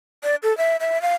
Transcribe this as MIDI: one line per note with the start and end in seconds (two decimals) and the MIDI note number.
0.24 0.36 74
0.43 0.56 69
0.58 0.76 76
0.80 1.00 76
1.02 1.15 77